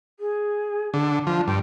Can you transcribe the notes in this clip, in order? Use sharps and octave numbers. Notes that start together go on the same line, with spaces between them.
G#4
D3
F3 D4
G2 G5